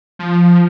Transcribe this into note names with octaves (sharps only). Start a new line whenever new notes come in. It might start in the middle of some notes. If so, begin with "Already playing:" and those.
F3